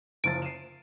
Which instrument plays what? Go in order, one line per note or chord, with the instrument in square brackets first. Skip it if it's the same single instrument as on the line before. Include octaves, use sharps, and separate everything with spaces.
[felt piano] F#1 F3 A6 [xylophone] D7
[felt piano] C7 D#7 E7